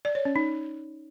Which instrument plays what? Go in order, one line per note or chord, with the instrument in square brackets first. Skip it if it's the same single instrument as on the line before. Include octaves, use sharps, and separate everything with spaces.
[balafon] D5
C#5
C#4
D#4